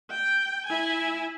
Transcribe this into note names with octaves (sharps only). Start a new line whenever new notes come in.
G5
E4 G#5